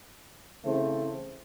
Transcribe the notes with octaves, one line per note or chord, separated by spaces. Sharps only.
C#3 E3 A3 C4